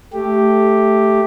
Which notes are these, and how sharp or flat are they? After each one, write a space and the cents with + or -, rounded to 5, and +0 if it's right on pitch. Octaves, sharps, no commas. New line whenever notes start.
A3 -5 G4 +0